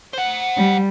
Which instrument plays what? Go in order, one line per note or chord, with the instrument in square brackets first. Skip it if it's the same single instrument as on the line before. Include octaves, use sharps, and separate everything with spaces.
[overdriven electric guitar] C5 F#5
[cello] G3